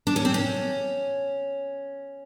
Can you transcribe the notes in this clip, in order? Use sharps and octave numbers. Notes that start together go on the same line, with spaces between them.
D4
C#4
C4
C#4